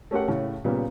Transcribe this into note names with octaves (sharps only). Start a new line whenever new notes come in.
A3 C#4 G4 A#4 F#5
A2 C#3 C#4
A#2 C#3 G3 B3